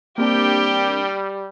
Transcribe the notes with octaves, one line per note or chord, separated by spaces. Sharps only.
G3 A#3 C4 D4 G4 G5